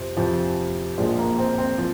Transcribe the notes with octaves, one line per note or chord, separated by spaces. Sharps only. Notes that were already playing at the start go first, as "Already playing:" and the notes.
Already playing: F2 C3 F3 C4
F2 C3 F3
A#1 A#2 F3 G#3
A#3
C4
C4
F3